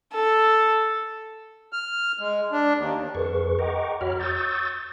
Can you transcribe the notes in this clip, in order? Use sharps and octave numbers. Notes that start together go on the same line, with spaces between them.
A4
F6
G#3
D4
D#2
F2 G#4 A#4 B4 C#6
D#5 F#5 G5 A#5 C#6 D6
F2 F#4 C#5 A#5 B5 F6
C#6 D#6 E6 G6 A6